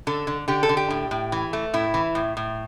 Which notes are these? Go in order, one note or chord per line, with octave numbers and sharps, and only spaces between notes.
D3 A4
D3
D3 G4
A4
D3
G4
A2
A2
E3
A3
A2 E4
E3
A2
A2